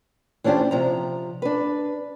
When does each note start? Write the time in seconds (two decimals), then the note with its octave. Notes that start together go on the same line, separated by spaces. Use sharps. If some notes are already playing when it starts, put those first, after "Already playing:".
0.44 E3 C#4 D4 F4 G4 C5
0.71 C3 F3 A#5
1.42 D4 B4